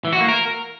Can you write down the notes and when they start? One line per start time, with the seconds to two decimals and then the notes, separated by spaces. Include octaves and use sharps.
0.05 E3
0.13 F#4
0.21 A#3
0.28 A#4